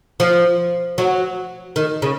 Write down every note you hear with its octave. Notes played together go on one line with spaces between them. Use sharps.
F3
F#3
D#3
C#3